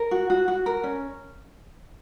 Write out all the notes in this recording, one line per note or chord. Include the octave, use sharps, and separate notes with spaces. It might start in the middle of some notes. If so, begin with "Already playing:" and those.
Already playing: A#4
F#4
F#4
F#4
A#4
C#4